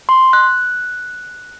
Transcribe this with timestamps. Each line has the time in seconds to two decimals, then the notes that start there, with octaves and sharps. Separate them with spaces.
0.09 C6
0.33 F#6